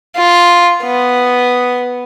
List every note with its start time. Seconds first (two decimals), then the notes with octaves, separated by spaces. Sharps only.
0.16 F4
0.83 B3